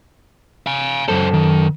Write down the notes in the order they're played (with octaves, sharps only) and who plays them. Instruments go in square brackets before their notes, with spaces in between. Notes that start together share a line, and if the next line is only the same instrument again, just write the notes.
[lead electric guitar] F5 G#5
[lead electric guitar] C#2 C5 [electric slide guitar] F#2 A4
[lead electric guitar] D#3